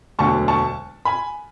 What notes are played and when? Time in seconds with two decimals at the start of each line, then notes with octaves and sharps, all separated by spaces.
0.18 E1 D2 D3 F#3 A5 C#6
0.48 A5 C#6
1.05 G#5 B5